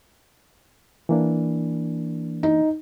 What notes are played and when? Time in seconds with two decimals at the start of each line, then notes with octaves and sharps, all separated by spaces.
1.09 E3 A#3 D4
2.43 D#4